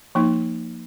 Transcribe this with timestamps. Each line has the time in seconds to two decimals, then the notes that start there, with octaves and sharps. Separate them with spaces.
0.15 F3 A#3 D#4